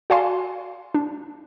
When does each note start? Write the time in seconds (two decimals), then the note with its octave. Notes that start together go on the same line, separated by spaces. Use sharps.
0.10 F#4 D5 F5 G#5 A5 C6
0.94 D4